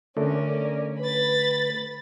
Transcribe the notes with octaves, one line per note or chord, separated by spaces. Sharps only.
D3 A3 C#4 A#4 D5
B4 B5 A6